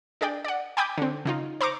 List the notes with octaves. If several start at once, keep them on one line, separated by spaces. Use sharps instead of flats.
D4 G#4 D5 G5
D5 F#5
G5 G#5 B5 D6 D#6 G6
D3 C4
C#3 D#4 F4
C5 A#5 C#6 D6